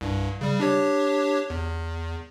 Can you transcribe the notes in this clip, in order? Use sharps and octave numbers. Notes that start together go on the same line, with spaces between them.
C2 G2
C#3 G3
D4 G4 C#5
E2